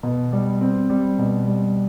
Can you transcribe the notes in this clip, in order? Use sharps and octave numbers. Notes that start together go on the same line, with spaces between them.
B2
G3
C4
G3
B2
G3